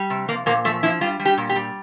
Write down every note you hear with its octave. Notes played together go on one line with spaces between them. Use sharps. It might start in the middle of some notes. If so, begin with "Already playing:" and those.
Already playing: G3
C3
F3 A#3
A#2 A#3
F3 A3
F3 E4
G3 F4
G3
G4
A#2
G4
G3